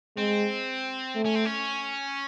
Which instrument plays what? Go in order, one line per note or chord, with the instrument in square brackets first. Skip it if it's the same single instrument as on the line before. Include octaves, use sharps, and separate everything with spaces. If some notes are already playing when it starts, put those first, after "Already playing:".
[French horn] G#3 [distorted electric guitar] C4
[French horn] A3
[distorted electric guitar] C#4
C4
C#4